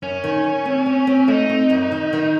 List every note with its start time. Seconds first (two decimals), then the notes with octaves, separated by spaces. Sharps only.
0.02 F#2 C#4
0.24 D#3
0.44 D#3
0.65 C4
0.86 C4
1.07 C4
1.28 A3 D#4
1.49 C4
1.70 F#2
1.92 D#3
2.13 D#3